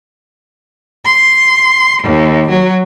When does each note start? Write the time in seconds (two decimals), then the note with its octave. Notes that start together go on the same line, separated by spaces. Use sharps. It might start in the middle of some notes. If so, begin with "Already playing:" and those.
1.06 C6
2.02 D#2
2.49 F#3